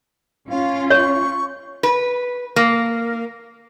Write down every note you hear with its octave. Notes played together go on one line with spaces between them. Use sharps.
C#4 F4 F5
C#5 C#6
B4
A#3